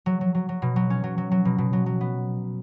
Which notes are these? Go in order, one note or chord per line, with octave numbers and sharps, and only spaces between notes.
F#3
F#3
F#3
F#3
B2
F#3
C#4
F#3
F#3
F#3
B2
B2
F#3
F#3
B3